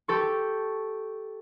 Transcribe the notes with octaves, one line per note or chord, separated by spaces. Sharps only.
G4 A4 C#6